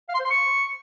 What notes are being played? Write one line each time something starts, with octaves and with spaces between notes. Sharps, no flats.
F5
C6
C5
C6
C#6